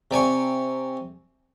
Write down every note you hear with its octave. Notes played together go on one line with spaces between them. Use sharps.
C3 D5 G#5 C#6